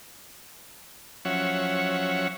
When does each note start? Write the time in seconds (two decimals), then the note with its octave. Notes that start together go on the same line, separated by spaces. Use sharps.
1.25 F3 F#3 C#4 C#5 E5 F#5